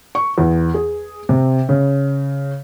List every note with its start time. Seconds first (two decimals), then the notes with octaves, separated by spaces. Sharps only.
0.15 C#6
0.38 E2
0.74 G#4
1.29 C3
1.69 C#3